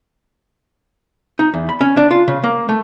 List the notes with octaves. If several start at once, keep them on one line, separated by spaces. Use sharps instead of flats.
D#4
E2
B5
C#4
D4
F4
C#3
A#3
A3